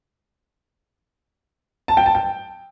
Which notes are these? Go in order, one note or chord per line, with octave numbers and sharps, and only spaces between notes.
A5
G5
A5
G5